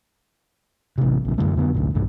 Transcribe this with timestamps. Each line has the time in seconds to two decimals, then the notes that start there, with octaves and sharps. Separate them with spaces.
0.98 A1 C3
1.25 A#1 C#3
1.38 F#2 D3 A3
1.56 F2 D3 B3
1.75 A1 D2 A#2
1.95 B1 G2